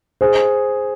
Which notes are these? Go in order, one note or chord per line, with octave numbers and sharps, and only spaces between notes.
G#4 C5